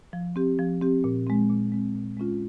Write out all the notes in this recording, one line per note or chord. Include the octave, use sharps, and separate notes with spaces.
F3
C4 G4
F3
C4 G4
A#2
G#3 C4
A#2
G#3 C4
A#2
G#3 C#4 F4